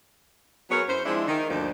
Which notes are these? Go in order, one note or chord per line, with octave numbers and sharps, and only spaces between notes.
F#3 B3 G#4 A#4 C#5
F#2 C#4 E4 C5
F3 G#3 C4 D4 E4
D#3
D2 G2 F3 A#3 D4 C5